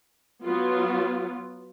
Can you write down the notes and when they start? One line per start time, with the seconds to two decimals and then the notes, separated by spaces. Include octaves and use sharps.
0.42 F#3 B3 F4